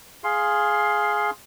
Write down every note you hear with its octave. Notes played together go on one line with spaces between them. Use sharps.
G#4 F5 C6